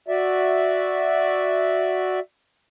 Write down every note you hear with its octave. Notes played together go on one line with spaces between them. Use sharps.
F#4 D5 E5